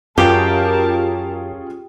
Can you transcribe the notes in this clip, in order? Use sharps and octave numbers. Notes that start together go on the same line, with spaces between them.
F#2 C#4 F4 G4 G#4 A#4 A5